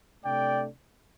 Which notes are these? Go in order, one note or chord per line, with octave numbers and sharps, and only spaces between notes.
C3 A3 D4 D5 G5